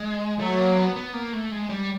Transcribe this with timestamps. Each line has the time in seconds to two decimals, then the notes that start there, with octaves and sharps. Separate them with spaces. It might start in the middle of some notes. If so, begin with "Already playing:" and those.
Already playing: G#3
0.39 F#3 A3
0.58 A#3
0.77 B3
0.96 B3
1.14 A#3
1.33 A3
1.52 G#3
1.70 G3